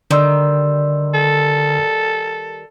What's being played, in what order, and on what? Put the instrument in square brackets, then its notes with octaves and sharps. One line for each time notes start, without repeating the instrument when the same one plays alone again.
[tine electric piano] D3 C6 E6 [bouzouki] D#3 G3
[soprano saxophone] A4